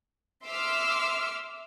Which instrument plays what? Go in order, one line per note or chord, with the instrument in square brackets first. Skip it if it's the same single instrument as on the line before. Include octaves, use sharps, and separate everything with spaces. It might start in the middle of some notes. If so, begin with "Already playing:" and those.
[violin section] E5 C6 D6 E6 F6